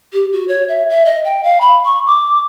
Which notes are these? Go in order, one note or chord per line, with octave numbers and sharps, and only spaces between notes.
G4
F#4
C#5
E5
E5
D#5
G5
F5
B5
C#6
D6